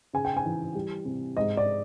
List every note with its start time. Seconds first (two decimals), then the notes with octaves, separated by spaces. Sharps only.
0.13 C#3 G#5
0.25 G5
0.37 G#5
0.45 E3
0.75 G3
1.05 C3
1.37 G#2 D#5
1.57 D5